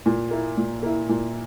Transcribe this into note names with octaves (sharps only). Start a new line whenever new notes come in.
A#2
A#3 E4
A#2
A#3 E4
A#2